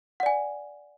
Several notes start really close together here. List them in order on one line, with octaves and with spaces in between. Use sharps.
F#5 D5 G#5